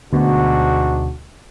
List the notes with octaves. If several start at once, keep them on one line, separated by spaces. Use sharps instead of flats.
D2 G#2 B2 D4 F#4